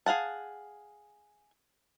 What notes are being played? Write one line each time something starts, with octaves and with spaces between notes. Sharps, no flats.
G#4 F5 F#5 A5